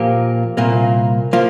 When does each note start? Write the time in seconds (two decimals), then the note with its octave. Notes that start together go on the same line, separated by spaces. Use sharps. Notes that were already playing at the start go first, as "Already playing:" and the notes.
Already playing: A#2 F3 A#3 G4
0.57 C2 A#2 A#3
1.33 F3 A#3 F4